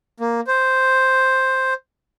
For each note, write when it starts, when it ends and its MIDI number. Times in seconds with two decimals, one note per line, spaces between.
0.20 0.41 58
0.47 1.74 72